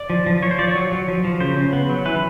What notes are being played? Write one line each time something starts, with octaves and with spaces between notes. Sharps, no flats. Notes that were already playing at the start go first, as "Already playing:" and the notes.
Already playing: D5
F3
F3
F3 C#5
C5
F3 D5
C#5
F#3
F#3
F3
F3
C#3 C5
C#3
B3
F#3
E3 B4